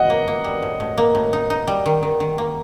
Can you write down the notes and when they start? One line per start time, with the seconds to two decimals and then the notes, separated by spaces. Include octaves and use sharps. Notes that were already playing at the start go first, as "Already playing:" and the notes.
Already playing: A2 D#5 F#5
0.10 A#3
0.28 A#3
0.44 G3
0.62 A2
0.80 A2
0.98 A#3
1.15 A2
1.33 D#4
1.50 D#4
1.67 G3
1.86 D#3
2.03 D#3
2.20 D#3
2.38 A#3